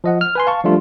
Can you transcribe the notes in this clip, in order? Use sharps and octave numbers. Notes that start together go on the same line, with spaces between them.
F3 D#5 F#5
F6
B4 G#5 C6
F5 A5 C#6
F3 G3 A3 D4 F4